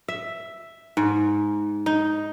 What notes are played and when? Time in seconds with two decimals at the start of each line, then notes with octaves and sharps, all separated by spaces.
0.08 E5
0.97 G#2
1.86 D#4